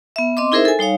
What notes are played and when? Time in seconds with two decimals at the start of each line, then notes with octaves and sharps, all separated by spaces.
0.16 B3 E5
0.37 C4 D#5 C6 D6
0.52 D#4 E4 G#4 A#4 C5 E5
0.65 A4 G#5
0.79 G3 D#4 C#5 F5